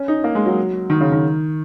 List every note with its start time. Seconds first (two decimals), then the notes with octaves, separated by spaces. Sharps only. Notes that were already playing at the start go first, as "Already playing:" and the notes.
Already playing: C#4
0.08 D#4
0.24 A#3
0.35 G#3
0.46 F#3
0.90 D#3
1.01 C#3
1.12 D#3